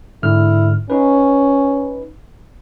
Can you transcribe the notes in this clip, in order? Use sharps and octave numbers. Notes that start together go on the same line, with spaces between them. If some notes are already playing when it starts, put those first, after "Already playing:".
G#2 D3 E4 F6
C#4 D#4 B4